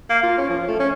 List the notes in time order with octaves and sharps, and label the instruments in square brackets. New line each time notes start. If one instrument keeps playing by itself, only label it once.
[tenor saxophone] A#3
F4
C#4
F3
A3
C#4